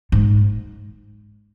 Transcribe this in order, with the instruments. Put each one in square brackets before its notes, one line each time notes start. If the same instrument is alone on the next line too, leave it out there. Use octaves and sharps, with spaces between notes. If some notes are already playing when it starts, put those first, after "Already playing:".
[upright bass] G#2